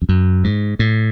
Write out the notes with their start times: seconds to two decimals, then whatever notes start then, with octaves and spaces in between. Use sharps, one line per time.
0.02 F2
0.09 F#2
0.44 G#2
0.79 A2